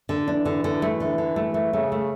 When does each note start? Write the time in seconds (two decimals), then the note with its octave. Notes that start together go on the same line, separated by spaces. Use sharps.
0.09 D3
0.28 E3 D4
0.45 D3
0.64 D3
0.82 A3
1.00 D3
1.18 D3
1.36 A3
1.54 A3
1.73 C#3 A3
1.92 A3